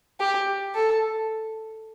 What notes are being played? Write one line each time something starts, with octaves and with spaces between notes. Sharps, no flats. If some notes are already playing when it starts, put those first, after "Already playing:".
G4
A4